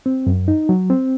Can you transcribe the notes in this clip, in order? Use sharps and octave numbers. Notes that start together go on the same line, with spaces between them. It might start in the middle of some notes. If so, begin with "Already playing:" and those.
C4
F#2
D#4
F#3
C4